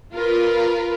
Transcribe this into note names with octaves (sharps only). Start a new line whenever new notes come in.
F4 A#4 B4